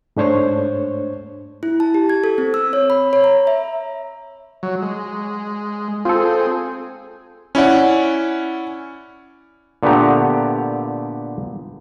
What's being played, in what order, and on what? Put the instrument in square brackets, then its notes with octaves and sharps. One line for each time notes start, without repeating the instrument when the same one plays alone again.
[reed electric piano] G#2 A3 D4 C5 C#5 C#6
[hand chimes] E4
A5
G4
G#6
A4
C4
E6
C#5
B5
C#5
A#5
E5
[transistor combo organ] F#3
G#3
[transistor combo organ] C4 G#4 [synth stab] F4 A4
[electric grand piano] C#4 E4 D5 F#5
[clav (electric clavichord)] A#2 D3 A3 B3 G4 A#5